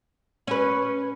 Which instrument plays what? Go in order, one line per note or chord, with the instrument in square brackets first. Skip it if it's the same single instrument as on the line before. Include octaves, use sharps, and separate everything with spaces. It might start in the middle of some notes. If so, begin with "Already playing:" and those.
[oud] C#4 B4